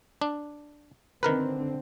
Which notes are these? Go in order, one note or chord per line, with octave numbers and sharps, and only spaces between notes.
D4
D3 D#3 C4 A#4 B4